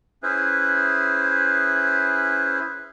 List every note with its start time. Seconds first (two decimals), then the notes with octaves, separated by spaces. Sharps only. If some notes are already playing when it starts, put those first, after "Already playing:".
0.23 C#4 E4 G#4 B4 C5 E5